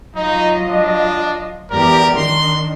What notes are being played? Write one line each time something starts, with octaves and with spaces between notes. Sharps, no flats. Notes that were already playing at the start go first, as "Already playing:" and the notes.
F#3 D#4 F4 D#5
D4
E2 G4 A#4 D5
D#3 D4 C6